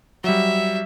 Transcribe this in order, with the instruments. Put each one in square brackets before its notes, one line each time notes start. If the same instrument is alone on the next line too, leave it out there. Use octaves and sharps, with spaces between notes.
[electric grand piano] F#3 G3 [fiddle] E5